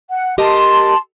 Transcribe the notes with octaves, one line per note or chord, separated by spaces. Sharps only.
F#5
G4 A#4 D#5 A5 C6